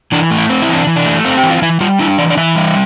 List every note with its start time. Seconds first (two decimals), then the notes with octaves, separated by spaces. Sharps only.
0.12 E3 D4
0.31 A3
0.37 E4
0.49 C4
0.62 E4
0.69 E3 D4
0.87 E3
0.96 D4
1.06 A3
1.24 C4 A4
1.37 G4
1.43 E3
1.49 F4
1.62 E3 E4
1.80 G3 F4
1.99 D4 E4
2.18 E3 D5
2.30 D5
2.37 E3 E5
2.56 G3